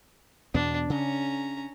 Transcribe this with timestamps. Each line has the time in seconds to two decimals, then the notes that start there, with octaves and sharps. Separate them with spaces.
0.54 E2 B2 B3 D4
0.90 C#3 C#4 A#5